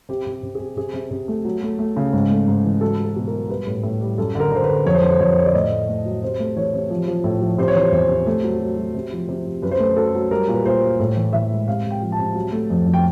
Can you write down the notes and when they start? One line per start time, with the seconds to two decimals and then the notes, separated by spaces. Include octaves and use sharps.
0.09 C3 G4
0.26 C3 G4
0.43 C3
0.55 C3 G#4
0.77 C3 G#4
0.94 C3
1.11 C3
1.28 A3
1.45 F#3
1.63 A3
1.79 A3
1.97 C#3
2.13 G#2
2.30 A3
2.48 G#2
2.64 E3
2.81 F#3 A4
2.99 F#3
3.04 A4
3.16 B2
3.28 F#3 A#4
3.49 G3 B4
3.67 A2
3.83 A2
4.01 G3
4.18 F#2 A4
4.35 D3 A#4
4.52 D3 C5
4.64 B4
4.69 D3
4.85 F2 C#5
4.95 C5
5.02 D3 B4
5.12 C5
5.19 F2 C#5
5.31 C5
5.37 D3 C#5
5.46 D5
5.54 A2 D#5
5.71 A3
5.88 A3
6.06 F#3
6.23 C3 C5
6.39 A3
6.56 E3 C#5
6.73 C3
6.90 F3
7.08 F3
7.24 A2
7.42 F3
7.58 C3 C5
7.68 C#5
7.75 E3 C5
7.92 E2 C5
8.09 C3
8.26 A3
8.44 F#3
8.60 F#3
8.77 F#3
8.95 C3
9.12 F3
9.29 C3
9.46 C3
9.62 F#2 B4
9.71 C5
9.80 A3 B4
9.96 F#3 A4
10.15 F#3
10.31 G3 A#4
10.48 A#2
10.54 B4
10.66 A#2 C5
10.83 G3
10.99 A2
11.16 E3
11.33 E3 E5
11.51 G#3
11.68 C3 F5
11.85 C3
11.91 G5
12.02 F3
12.12 A5
12.19 C3
12.35 F#3
12.52 A3
12.70 F2
12.86 F2
12.94 G5